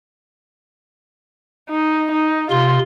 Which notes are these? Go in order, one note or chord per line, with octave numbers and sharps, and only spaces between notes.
D#4
D#4
C3 F4 C6